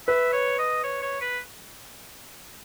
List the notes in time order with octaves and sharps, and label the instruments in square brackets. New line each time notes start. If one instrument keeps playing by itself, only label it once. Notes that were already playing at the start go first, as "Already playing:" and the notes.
[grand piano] B4 [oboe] E5
[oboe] C#5
D#5
C#5
C#5
B4